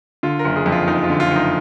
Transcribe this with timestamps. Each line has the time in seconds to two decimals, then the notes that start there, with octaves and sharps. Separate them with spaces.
0.23 D3 F4
0.39 A#4
0.45 F#1
0.56 G#4
0.66 F2
0.72 F4
0.87 F#1 D#4
1.04 F4
1.10 D3
1.20 F4
1.31 F#1
1.36 D#4